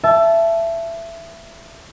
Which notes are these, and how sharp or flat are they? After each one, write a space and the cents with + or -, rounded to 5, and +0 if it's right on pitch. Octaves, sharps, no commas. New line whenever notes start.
E5 +20 A5 -15